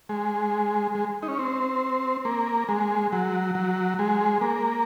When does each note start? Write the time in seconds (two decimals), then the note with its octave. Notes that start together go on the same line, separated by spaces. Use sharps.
0.09 G#3
0.95 G#3
1.22 D#4
1.28 C#4
1.39 C4
2.25 A#3
2.69 G#3
3.13 F#3
3.55 F#3
3.99 G#3
4.41 A#3